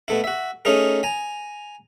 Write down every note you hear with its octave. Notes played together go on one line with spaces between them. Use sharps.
B2 A3 E4
F#4 E5
A3 C#4 D#4 G#4 A#4
G#5 A#5